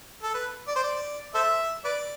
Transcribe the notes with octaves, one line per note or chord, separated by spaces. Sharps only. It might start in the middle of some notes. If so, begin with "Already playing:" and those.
A4
B4
D5
C5
D5
A4 C5 E5
B4 D5